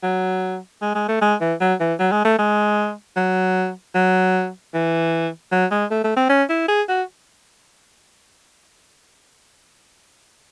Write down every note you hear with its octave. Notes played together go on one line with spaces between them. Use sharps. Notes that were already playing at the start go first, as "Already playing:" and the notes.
F#3
G#3
G#3
A3
G#3
E3
F#3
E3
F#3
G#3
A3
G#3
F#3
F#3
E3
F#3
G#3
A3
A3
C4
C#4
E4
G#4
F#4